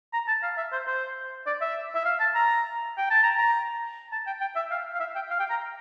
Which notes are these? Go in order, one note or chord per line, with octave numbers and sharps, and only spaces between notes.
A#5
A5
F5
E5
C5
C5
D5
E5
E5
F5
A5
A#5
G5
A5
A#5
A#5
A5
G5
G5
E5
F5
F5
E5
G5
F5
G5
A#5